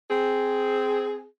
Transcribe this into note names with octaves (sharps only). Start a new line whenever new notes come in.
C4 G#4